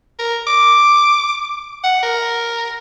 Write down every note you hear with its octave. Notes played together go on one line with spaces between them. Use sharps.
A#4
D6
F#5
A#4